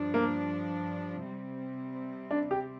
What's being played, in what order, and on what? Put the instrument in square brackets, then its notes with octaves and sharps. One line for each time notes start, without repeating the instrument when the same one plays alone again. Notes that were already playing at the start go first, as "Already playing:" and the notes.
Already playing: [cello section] G2 F3 D4
[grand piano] A#3
[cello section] C3 G3 C4
[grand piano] D4
G4